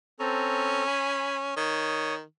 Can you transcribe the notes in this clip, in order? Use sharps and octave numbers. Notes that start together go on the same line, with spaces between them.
C4 C#4 A4 A#5
G#5 B5
D#3 C#5 D#6